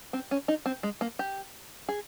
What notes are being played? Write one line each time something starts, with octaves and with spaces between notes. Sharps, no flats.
C4
C#4
D#4
C4
G#3
A#3
G4
G#4